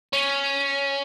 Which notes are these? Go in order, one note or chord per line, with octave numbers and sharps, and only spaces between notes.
C#4